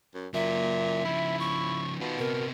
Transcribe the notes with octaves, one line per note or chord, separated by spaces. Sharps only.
F#2
A#2 C#3 F#3 E5
C#3 F3 E4
C#6
B2 D#3 F4
C3 B3 A#4